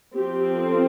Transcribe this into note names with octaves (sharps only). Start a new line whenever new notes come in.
F3 C4 G4
A4